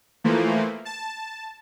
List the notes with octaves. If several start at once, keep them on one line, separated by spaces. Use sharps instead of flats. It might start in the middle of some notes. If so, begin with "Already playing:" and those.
E3 F3 A3 A#3
A5